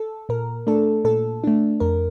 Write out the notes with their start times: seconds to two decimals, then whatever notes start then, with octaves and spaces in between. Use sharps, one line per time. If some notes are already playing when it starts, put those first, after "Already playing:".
Already playing: A4
0.29 A#2 A#4
0.67 A3 D4 A4
1.04 A#2 A4
1.44 A3 D4
1.80 F2 A#4